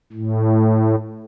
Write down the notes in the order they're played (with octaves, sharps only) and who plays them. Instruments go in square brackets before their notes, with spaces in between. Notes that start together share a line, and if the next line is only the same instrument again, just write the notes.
[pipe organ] A2